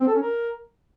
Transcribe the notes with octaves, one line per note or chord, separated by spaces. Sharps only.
C4
A4
C#4
A#4